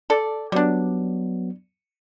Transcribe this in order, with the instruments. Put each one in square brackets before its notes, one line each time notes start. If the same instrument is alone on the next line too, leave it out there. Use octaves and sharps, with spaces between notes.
[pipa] A4 D5
[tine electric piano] F#3 B3 [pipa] G3 D4